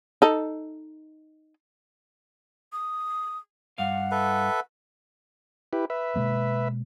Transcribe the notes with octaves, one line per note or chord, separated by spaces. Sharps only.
D#4 A4
D#6
G2 F5 F#5
A4 B4 E5
E4 G4 B4
B4 E5
B2 G#3 A#3